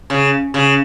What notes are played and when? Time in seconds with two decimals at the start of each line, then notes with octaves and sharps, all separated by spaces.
0.10 C#3
0.54 C#3